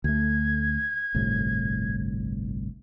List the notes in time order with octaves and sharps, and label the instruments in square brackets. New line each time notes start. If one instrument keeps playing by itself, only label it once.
[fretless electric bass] D2 A3 [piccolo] G#6
[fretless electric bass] G1 C2 A2